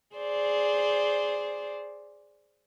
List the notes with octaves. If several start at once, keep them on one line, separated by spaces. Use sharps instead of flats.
G#4 C5 D5